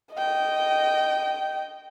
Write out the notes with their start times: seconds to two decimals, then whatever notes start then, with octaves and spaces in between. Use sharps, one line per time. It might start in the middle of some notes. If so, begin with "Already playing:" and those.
0.14 D#5 G5